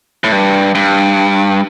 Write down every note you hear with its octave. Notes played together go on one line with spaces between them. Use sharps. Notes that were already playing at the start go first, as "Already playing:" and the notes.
A2
G2
G2